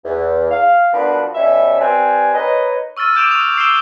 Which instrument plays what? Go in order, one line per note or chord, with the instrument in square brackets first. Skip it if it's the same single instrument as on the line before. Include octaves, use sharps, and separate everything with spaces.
[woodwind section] E2
F5
F3 A#3 B3 D4 F#4 B4
B2 G3 C#4 E5
G3 C4 B4 G#5
D#4 A#4 B4 C#5 D#5
[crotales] C#6 E6 F6 A6 D#7
C#6 D6 G6 D7 E7 F7
C#6 D#6 F7
D#6 E6 C7 D7 E7 G7